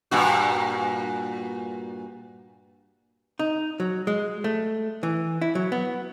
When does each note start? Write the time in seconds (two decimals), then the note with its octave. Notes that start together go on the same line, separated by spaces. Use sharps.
0.11 G2 A#2 F#4
3.39 D#4
3.80 F#3
4.07 G#3
4.44 A3
5.03 E3
5.41 E4
5.55 F#3
5.72 B3